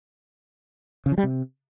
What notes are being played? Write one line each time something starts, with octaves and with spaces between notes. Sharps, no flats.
C#3
F3
G3
C3